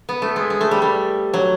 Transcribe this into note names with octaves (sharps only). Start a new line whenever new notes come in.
B3
A3
G#3
G#3
A3
G3
G3
F#3